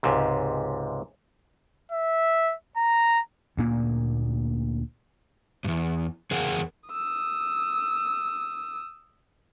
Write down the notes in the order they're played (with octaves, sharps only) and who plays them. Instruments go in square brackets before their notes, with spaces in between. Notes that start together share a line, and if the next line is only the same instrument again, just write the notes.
[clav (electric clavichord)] C#2 G#2 C3
[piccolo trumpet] E5
A#5
[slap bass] D2 A#2 A#3
[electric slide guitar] E2 G2
E2 G#4 A#4 F#5
[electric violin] D#6 E6